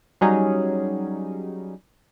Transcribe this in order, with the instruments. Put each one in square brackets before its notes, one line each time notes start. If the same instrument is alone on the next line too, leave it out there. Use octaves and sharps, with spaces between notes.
[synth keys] F#3 G3 C#4 D#4 G#4